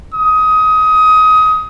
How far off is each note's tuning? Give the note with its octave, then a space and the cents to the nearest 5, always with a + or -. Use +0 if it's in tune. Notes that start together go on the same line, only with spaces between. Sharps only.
D#6 +20